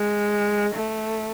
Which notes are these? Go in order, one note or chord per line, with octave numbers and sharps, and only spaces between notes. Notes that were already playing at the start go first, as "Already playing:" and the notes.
Already playing: G#3
A3